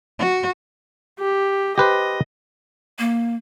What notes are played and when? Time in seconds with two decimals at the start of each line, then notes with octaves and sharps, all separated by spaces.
0.19 F#4
1.19 G4
1.78 G4 B4 C5 D#5
2.99 A#3